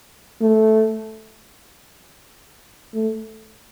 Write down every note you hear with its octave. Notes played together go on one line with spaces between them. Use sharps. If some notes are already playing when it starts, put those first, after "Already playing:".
A3
A3